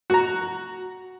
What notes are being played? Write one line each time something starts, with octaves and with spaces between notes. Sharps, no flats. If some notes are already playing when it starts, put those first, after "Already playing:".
F#4 A#5